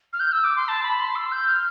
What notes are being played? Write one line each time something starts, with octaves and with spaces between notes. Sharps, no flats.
F6
G6
E6
D6
C6
A5
B5
C6
E6
G6
F6